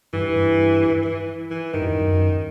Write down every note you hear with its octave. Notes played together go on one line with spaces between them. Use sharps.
G2 E3
G2
E3
E3
G2 D#3
F#2
F#2